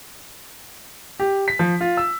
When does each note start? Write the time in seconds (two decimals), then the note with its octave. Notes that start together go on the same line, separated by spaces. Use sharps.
1.20 G4
1.48 B6
1.59 F3
1.81 F4
1.97 E6